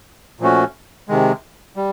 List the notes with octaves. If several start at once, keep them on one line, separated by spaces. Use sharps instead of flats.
A#2 F3 A3 C#4 F#4
C3 D#3 G#3
G3